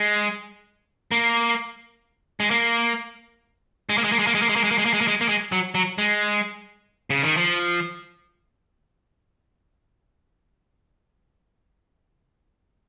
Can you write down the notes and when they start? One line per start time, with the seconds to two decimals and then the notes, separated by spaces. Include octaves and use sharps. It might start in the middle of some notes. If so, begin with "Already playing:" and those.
Already playing: G#3
1.12 A#3
2.40 G#3
2.51 A#3
3.89 G#3
3.98 A#3
4.04 G#3
4.12 A#3
4.19 G#3
4.27 A#3
4.35 G#3
4.42 A#3
4.49 G#3
4.56 A#3
4.64 G#3
4.71 A#3
4.78 G#3
4.85 A#3
4.94 G#3
5.01 A#3
5.08 G#3
5.21 A#3
5.29 G#3
5.52 F#3
5.75 F#3
5.98 G#3
7.10 C#3
7.23 D#3
7.37 F3